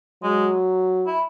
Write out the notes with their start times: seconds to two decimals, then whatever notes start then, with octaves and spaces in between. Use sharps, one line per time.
0.23 F#3 G#3
1.07 E4